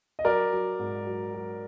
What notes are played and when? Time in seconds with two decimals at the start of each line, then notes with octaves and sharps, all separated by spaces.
0.19 D#5
0.25 F#3 A#4 D5
0.53 F#3
0.79 G#2
1.07 F#3
1.34 F#3